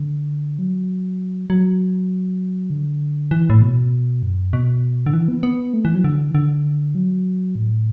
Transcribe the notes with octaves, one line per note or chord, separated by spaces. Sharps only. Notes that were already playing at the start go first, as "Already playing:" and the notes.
Already playing: D3
F#3
F#3
D3
E3
A2
B2
F#2
B2
D3
E3
B3
B3
A3
E3
F#3
D3
E3
D3
F#3
A2